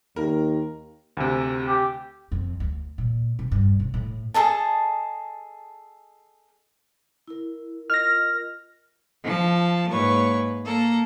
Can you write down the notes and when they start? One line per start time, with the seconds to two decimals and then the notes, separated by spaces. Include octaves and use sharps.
0.16 D#2 A#4
1.17 D2 C3
1.66 G4
2.32 F2
2.60 D2
2.98 A#2
3.39 C3
3.51 G2
3.80 C3
3.94 A2
4.34 G#4 A4 D#5 A5
7.28 E4 A#4
7.90 F4 A#4 D#5 F6 A#6
9.23 F3 A5
9.91 G#2 A#3 B4 C#5 C#6
10.65 A#3 A4 A#5